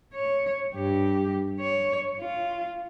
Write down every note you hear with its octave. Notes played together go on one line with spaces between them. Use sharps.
C#5
G2 G4
C#5
F4